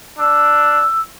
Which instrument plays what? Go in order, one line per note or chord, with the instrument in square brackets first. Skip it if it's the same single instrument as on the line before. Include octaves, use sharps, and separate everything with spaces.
[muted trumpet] D4 [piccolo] E6